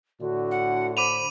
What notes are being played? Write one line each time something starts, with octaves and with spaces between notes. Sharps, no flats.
A2 D3 F#4
F#5
C5 B5 D6 D#7 F7